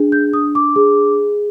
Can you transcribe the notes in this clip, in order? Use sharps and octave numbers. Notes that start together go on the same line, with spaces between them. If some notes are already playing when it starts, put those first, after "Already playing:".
Already playing: D4 G#4
G6
D4 D#6
D6
G#4